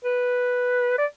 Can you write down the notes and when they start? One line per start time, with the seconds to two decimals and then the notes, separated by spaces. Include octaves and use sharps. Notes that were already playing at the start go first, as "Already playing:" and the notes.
0.04 B4
0.98 D5